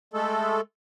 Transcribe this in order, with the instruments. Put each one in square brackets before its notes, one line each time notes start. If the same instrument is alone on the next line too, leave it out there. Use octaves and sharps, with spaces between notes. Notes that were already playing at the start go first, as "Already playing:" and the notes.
[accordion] G#3 A3 A4